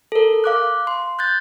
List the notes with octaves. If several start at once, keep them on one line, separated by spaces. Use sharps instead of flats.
A4 A#4
F5 D6 F#6
C6
F#6 G6 A6